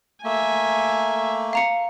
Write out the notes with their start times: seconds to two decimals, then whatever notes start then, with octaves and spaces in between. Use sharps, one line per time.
0.24 A3 A#3 E5 G#5
1.53 F5 A#5 C#7